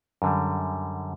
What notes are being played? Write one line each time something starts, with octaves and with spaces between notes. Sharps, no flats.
F#2 D3 G3